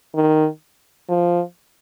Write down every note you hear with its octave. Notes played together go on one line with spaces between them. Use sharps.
D#3
F3